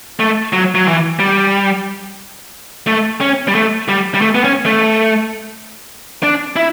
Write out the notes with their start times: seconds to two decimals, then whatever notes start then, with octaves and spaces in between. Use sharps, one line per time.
0.19 A3
0.53 F#3
0.75 F#3
0.87 E3
1.19 G3
2.87 A3
3.21 C#4
3.48 G3
3.55 A3
3.88 G3
4.14 G3
4.21 A3
4.35 B3
4.44 C#4
4.66 A3
6.23 D4
6.56 E4